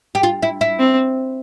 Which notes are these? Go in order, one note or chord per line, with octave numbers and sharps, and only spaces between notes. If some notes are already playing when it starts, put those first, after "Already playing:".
G4
F4
E4
E4
C4